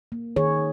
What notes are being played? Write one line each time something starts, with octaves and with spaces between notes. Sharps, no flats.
A#3
D#3 G#4 C#5